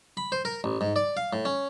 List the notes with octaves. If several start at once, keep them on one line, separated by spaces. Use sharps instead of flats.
B5
C5
A#4
A1
G#2
D5
F5
A2
C#4